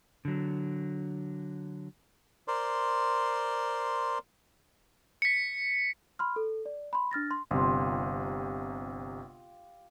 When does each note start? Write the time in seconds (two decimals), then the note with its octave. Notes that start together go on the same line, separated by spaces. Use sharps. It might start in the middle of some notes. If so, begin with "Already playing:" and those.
0.25 D3 F#3
2.48 A#4 C5 D5 C6
5.22 B6 C#7
6.19 B5 C6 F6
6.36 A4
6.65 D5
6.93 B5 C6
7.11 D4 F6 A6 A#6
7.31 C6
7.51 G1 C3 F4 G4